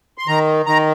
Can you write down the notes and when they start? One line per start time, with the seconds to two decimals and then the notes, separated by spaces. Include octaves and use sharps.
0.18 C6
0.27 D#3 A#5
0.66 D#3 A#5